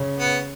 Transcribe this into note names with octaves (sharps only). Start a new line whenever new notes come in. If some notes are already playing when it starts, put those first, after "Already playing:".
Already playing: C#3
B3